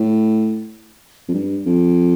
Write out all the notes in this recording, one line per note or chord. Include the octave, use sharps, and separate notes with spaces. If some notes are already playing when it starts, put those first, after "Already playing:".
Already playing: A2
F2
G2
F2